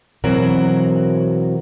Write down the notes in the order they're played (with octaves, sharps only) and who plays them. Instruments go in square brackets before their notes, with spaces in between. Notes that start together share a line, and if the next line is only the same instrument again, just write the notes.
[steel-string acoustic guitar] B2 E3 F#3 C4 F#4 A#4